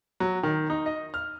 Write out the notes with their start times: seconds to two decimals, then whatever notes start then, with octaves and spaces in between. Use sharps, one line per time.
0.20 F#3
0.43 D#3
0.70 D#4
0.86 D#5
1.14 F6